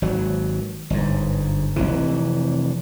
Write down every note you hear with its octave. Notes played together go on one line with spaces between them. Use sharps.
G#1 F#3
G1 G#2
F1 C2 C3 E3